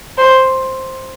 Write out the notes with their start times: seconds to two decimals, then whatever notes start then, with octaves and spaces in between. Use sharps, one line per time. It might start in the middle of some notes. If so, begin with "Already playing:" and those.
0.18 C5